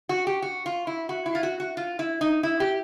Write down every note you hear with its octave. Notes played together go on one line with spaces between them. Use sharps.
F#4
G4
F#4
F4
E4
F#4
E4
F4
F#4
F#4
F4
E4
D#4
E4
G4